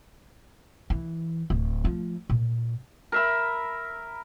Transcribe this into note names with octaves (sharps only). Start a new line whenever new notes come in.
E3
D1
F3 A3
A#2
A#4 E5 B5